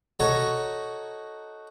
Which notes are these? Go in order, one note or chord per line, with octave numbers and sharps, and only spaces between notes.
D#4 F#4 A4 C#5 A#5